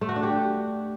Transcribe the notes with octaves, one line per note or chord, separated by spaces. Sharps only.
A3
F#4
D4
G4